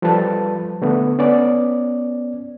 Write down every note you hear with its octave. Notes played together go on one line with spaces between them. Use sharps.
F3 G3 A4 B4 A5
D3 A3 B3
B3 C#4 D5